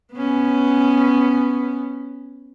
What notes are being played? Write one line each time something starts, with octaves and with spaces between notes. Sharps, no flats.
B3 C#4